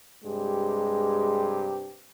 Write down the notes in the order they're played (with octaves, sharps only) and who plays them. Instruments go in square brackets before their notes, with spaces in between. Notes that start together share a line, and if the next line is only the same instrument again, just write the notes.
[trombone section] G2 C3 G4 [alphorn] G#3